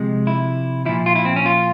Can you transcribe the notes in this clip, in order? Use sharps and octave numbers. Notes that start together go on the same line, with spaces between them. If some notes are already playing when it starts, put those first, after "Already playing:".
Already playing: C3 F3 G#3
E4
A#2 F3 E4
F4
E4
C4
C#4
F4